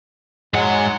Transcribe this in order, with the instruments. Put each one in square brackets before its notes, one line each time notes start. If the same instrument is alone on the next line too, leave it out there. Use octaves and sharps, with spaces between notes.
[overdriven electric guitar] G#2 F#5 [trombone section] F#3 G#3